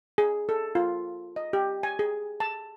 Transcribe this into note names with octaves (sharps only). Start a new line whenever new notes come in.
G#4
A4
F4
D#5
G4
G#5
G#4
A5